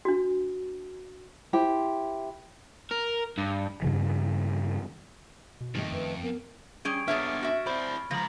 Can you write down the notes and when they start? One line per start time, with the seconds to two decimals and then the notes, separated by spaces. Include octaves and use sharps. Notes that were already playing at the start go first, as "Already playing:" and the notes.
0.05 D4 F#4
1.53 E4 G4 C5
2.91 A#4
3.38 G2
3.82 G2 C#3 E3
5.61 B2
5.75 F2 D#3 A3 D#4
5.92 F#2 B4
6.23 B3 A#4
6.85 G3 C#4 G#4 C#6 G#6 D7
7.08 B3 D4 G#4 C#5 E5 F6 A6
7.43 F#4 E5
7.67 E4 C5 D5 B5
8.11 C#2 F3 A#5 A#6 F#7